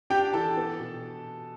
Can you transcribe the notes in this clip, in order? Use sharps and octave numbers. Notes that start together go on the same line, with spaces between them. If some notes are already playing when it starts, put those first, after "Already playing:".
D4 G4 G5
E3 A4 A5
B3
B2